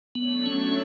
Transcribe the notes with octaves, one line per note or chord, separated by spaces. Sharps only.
F#3 A3 B3 D4 A4 C#5
C#4